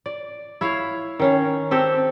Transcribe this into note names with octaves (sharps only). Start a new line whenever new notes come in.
D5
E4 C#5 F5
D#3 C#4 F5
C4 G4 A4